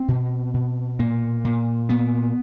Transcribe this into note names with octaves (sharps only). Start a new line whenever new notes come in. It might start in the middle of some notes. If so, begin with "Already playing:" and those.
Already playing: C4
B2
B2
A#2 A#3
A#2
A#2 B3